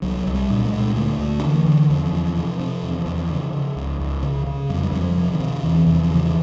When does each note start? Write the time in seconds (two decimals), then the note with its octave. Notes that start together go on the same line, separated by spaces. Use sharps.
0.02 C2 F#3
0.26 C2
0.34 G3
0.50 A#2
0.65 G#3
0.73 A#2
0.95 D2 A3
1.19 D2
1.43 D3 E3
1.66 D3
1.90 E2 F3
2.12 E2
2.37 C3
2.59 C3
2.83 E2
3.06 E2
3.29 C#3
3.53 C#3
3.76 C#2
4.00 C#2
4.23 C#3
4.46 C#3
4.70 F2 F#3
4.83 G3
4.91 F2 F#3
5.01 F3
5.17 C3
5.33 D#3
5.40 C3
5.63 E2 E3
5.86 E2
5.94 F3
6.10 C#3
6.26 E3